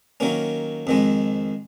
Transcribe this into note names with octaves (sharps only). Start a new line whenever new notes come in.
D#3 F#3 A#3 C#4
F2 D#3 G#3